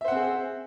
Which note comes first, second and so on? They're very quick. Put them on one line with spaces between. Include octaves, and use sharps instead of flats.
E5 C5 F#5 C4 G#4